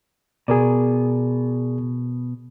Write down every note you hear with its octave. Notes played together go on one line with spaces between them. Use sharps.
B2 G#4 A#4 D5